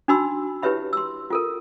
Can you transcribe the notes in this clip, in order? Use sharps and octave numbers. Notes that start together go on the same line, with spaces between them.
D4 D#4 F#4 B5 C6 E6
E4 G4 B4 C#5 E5 B5
C6 E6
F4 A4 A#4